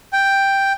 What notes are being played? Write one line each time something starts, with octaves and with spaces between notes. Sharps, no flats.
G5